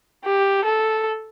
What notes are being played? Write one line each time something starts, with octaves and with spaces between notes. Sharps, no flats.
G4
A4